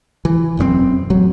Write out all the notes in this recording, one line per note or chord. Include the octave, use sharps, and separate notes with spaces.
E3
E1 F#2 A3 C4
A1 F#3